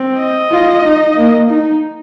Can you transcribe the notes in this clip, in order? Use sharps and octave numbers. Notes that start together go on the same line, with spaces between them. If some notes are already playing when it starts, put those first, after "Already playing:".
Already playing: C4
D#5
F4
D#4
A#3
D#4